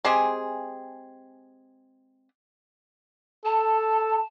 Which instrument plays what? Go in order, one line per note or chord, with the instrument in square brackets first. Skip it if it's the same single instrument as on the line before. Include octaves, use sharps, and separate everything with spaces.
[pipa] G#3 C4 G4 G#4
[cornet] A4 [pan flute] A5